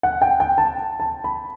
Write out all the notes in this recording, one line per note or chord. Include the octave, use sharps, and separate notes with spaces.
F#5
G5
G5
A5
A5
B5